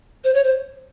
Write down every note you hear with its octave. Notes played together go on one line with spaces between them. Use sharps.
C5
C#5
C5